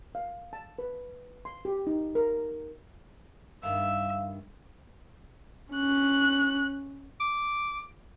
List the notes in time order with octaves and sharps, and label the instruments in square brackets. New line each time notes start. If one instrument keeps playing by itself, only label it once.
[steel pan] F5
A5
B4
C6
G4
D#4
A#4
[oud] G2 D#3 [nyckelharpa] E5 [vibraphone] F5
[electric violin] C#4 F#6
[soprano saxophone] D6